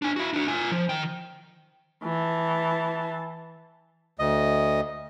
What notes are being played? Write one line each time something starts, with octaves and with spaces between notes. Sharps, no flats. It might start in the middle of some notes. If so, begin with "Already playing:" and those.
D4 G#5
E4 F#4
D4 F#4
F4 G#5
F3
D#3 G5
E3 A5
D2 D#5